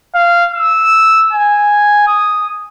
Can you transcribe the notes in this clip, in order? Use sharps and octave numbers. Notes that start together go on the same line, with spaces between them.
F5
E6
G#5
D#6